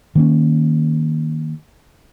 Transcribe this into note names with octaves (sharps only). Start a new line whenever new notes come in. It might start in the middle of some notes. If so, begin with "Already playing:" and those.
D#3 A#3 C#4